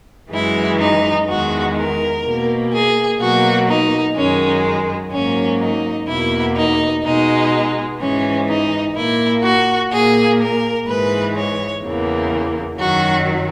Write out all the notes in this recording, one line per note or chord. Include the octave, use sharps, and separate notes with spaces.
F#2 E3 G#3 E4
D#4
E2 D#3 G#3 F#4
A#4
B2 A#3
G#4
B2 F#3 A#3 F#4
D#4
F#2 D#3 G#3 C#4
G#2 F#3 A#3 C#4
D#4
E2 B2 A#3 E4
D#4
B2 G#3 D#4
G#2 E3 G#3 C#4
D#4
A#2 A#3 E4
F#4
A#2 A#3 G#4
A#4
G#2 E3 G#3 B4
C#5
E2 C#3 E3 A#3
F#2 D#3 F#3 F#4